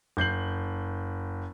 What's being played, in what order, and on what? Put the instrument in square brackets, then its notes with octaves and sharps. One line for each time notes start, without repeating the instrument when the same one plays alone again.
[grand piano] F#1 G6 C7 F#7